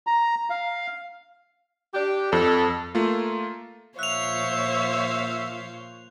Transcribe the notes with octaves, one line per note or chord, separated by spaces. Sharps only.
A#5
F5
D4 G4
F2 A4
A3 A#3 F4
A#2 F3 C5 C#5 E5 F5 F#6 F7